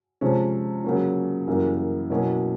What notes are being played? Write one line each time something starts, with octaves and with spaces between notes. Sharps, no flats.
C3 F3 G#3 C#4
C#3 F#3 A#3 C#4
F#2 C#3 E3 G3 A#3
B2 F#3 A#3 C#4 E4